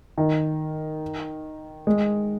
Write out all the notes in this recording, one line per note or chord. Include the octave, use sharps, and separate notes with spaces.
D#3
G#3